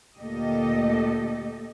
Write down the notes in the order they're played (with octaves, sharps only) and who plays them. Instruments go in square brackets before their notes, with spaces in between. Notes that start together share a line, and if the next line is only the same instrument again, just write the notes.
[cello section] D2 A#2 A3 G4 A4 D#5